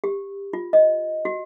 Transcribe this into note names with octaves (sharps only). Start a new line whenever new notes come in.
G4
F4
D#5
F#4